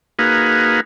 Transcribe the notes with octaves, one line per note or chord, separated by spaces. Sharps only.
A#3 D#4 F#4 G#4 B4 F5